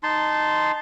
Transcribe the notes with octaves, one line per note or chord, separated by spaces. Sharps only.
D#4 A5 C6